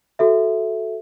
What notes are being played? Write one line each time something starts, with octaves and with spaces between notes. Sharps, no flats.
F#4 A4 E5